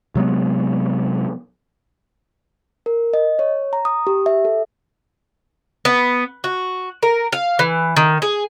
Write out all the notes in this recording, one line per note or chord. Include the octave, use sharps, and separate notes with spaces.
C3 F#3 G#3 B3
A#4
D#5
C#5
A#5
D#6
G4
E5
A4
B3
F#4
A#4
F5
E3
D#3
G#4